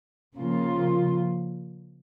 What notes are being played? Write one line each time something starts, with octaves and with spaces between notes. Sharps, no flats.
C#3 F3 A#3 F4